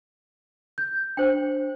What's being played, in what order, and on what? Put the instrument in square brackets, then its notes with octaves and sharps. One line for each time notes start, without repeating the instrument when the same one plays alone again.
[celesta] G6
[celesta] D4 [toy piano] C5 G5